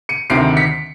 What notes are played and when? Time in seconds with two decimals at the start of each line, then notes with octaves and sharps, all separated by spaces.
0.09 C#7 D#7
0.30 D2 C3 D#3 C7 D7
0.57 B6 C#7